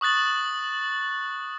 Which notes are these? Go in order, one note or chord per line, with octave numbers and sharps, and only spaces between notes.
C#6 D#6 F#6 A6 F#7